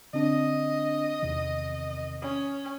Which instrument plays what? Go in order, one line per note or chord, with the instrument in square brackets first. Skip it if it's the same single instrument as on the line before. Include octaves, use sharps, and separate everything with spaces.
[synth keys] D3 C4 D4 [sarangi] D#5
[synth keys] E2 C3 D#3
[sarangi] C#4 [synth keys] D#6